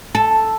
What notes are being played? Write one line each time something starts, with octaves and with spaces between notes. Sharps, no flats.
A4